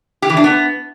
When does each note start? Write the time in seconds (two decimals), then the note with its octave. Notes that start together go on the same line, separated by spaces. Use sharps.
0.22 G4
0.30 E3
0.37 D4
0.44 B3